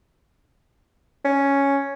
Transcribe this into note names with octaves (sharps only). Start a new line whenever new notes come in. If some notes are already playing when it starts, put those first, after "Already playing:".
C#4